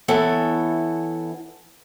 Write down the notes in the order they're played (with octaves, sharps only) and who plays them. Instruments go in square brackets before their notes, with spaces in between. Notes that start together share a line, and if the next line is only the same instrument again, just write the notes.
[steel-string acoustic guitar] E3 B3 E4 A4 C#5